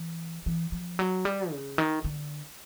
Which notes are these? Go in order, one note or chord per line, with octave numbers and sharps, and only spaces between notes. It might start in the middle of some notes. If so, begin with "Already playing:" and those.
Already playing: E3
E3
F3
F#3
G3
C#3
D#3
D3